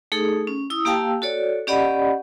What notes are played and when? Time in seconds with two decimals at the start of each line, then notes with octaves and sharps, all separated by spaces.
0.12 A3 D#4 G#4 A4
0.47 C#4
0.70 E4 D#6 E6
0.85 A#3 G4 F5 G5 A5 E6
1.22 F#4 A4 C#5 D5
1.67 C#4 G4 D5 D#5 F#5 B5